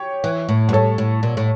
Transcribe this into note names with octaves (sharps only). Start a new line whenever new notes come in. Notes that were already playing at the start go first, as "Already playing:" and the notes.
Already playing: G4 C#5
E3
A2
G2
A2 A4 C#5
A2
A#2
A2